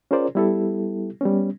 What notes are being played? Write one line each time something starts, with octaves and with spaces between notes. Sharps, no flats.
C#4 F4 G#4 A#4 C5 D5
G3 B3 E4 G4 A4
G3 B3 C#4